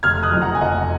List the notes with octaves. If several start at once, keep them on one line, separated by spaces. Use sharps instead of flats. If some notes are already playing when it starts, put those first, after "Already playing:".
F1 F6 G#6
D#6 F#6
F2 F3
F#5 A#5
G#5
F1 D#5 F#5